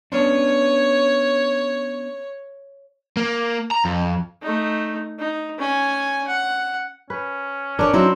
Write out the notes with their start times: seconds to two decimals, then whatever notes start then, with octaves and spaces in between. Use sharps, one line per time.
0.12 B3 C#4 D4 C#5
3.17 A#3
3.71 A#5
3.85 F2
4.42 A3 D#4
5.18 D#4
5.59 C#4 G#5
6.28 F#5
7.10 C#4 B4
7.79 D4 A#4 B4 C#5
7.93 F#3 C4 C#4 D#4 E4